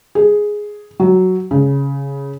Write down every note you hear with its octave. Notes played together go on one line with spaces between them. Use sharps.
G#4
F#3
C#3